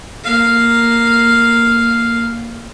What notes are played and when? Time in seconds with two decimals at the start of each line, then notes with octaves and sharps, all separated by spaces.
0.24 A#3 F5